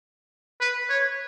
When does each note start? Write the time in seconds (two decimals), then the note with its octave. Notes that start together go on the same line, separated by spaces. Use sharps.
0.60 B4
0.90 C#5